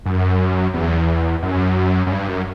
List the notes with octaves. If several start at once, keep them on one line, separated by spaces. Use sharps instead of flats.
F#2
E2
F#2
F#2
G2
F#2